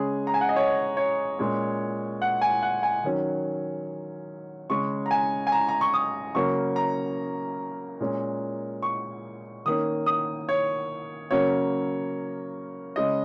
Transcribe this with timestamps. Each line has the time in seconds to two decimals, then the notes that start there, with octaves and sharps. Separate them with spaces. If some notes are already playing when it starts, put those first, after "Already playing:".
Already playing: C#3 G#3 C#4 G#4
0.27 A#5
0.34 G#5
0.41 F#5
0.49 D#5
0.56 C#5
0.97 C#5
1.39 A#2 G#3 C#4
2.22 F#5
2.42 G#5
2.63 F#5
2.83 G#5
3.04 D#3 F#3 C#4
4.70 C#3 G#3 C#4 C#6
5.06 A#5
5.11 G#5
5.47 G#5
5.52 A#5
5.69 A#5
5.81 C#6
5.94 D#6
6.35 C#3 F#3 A#3 C#4 C#6
6.76 A#5
8.00 A#2 G#3 C#4
8.83 C#6
9.66 D#3 A#3 C#4 D#6
10.06 D#6
10.49 C#5
11.31 C#3 F#3 A#3 C#4 C#5
12.96 C#3 G#3 C#4 D#5